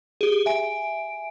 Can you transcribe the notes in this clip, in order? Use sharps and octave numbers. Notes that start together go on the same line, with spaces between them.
G4 G#4
E5 G#5 D7